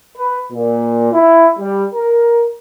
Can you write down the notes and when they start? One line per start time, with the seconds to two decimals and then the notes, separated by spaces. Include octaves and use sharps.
0.17 B4
0.51 A#2
1.13 E4
1.58 G3
1.94 A#4